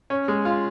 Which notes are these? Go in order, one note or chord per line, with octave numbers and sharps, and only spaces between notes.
C#4
G#3
F4